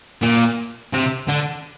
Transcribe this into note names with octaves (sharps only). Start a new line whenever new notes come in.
A#2
C3
D3